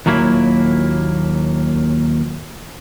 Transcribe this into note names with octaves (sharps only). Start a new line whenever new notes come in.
D#2 A#2 F#3 A#3 E4